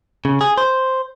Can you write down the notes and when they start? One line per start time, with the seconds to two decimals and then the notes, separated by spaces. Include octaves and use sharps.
0.25 C#3
0.41 G#4
0.58 C5